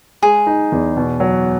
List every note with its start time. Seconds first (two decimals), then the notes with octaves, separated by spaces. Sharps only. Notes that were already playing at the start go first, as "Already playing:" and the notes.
0.22 G#3 G#4
0.47 D#4
0.72 E2
0.96 B2
1.20 F#3